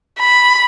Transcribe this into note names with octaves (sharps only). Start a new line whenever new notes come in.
B5